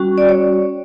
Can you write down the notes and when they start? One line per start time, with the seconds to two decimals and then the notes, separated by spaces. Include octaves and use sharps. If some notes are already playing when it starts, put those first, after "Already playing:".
Already playing: G3 C#4 F#4
0.18 D5
0.29 C#5